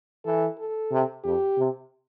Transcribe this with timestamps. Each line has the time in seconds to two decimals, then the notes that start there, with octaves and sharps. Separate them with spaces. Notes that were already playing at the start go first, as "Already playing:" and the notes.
0.25 E3 A4
0.58 A4
0.92 C3
1.24 F2 G4
1.57 C3